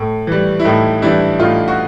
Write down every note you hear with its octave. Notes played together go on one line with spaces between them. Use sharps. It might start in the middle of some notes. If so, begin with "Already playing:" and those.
Already playing: A2
E3 G3
E4
A2 D#4
E3 G3 D4 E4
A2 D#4 F4
F#4